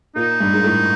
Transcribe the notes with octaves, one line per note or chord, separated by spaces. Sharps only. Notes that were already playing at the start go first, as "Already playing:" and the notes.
A#2 D#4
G2
G#2
A2